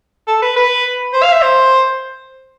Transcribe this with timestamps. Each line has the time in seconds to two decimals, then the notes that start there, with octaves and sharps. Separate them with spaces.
0.28 A4
0.42 B4
0.56 B4
1.14 C5
1.23 F5
1.32 E5
1.42 C5